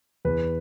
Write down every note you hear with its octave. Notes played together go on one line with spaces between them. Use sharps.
E2 B4